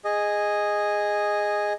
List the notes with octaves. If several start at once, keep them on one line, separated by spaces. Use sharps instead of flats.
G#4 D#5